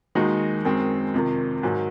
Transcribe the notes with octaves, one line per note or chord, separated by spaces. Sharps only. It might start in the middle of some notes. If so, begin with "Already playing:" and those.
D#2 D#3 G#3 D#4 F#4
F#2 D#3 G#3 C4
F2 C3 D#3
G#2 D#3 F#3